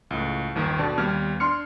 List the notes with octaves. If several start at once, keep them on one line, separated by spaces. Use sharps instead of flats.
C#2 A2
G1 D#2 D#3
B2 D3 D5 A5
D#2 G3 B3 F6 G#6
D4 C6 F6 C#7